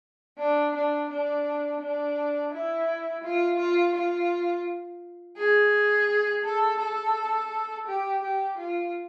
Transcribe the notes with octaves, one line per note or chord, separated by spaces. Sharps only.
D4
D4
D4
D4
E4
F4
F4
F4
G#4
A4
A4
G4
G4
F4